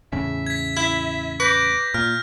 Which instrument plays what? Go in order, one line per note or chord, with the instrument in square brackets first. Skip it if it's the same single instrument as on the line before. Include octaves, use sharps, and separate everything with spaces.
[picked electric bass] E2 A2 C#3 [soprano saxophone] E5
[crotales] G#6 B6
[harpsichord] E4
[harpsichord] B4 [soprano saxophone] D6 [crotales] G6 A#6
[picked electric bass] A#2 [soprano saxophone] F4 [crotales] F6